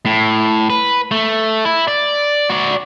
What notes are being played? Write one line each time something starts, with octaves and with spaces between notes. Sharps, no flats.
A2
B4
A3
E4
D5
F#4 D5